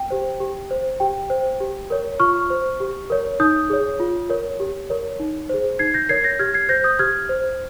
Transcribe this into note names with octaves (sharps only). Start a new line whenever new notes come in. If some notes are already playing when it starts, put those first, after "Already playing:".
Already playing: G5
G4 C5
G4
C5
G4 G5
C5
G4
A#4 C#5
F4 C#6 F6
C5
G4
A#4 C#5
D#4 D#6 G6
G#4 C#5
F4
A#4 C#5
G4
A#4 C#5
D#4
G#4 C5
D#4 G#6 C7
G6 A#6
A#4 C#5 G#6 C7
G6 A#6
G4 F6 G#6
G#6 C7
C5 G6 A#6
D#6 G6
G4 F6 G#6
C5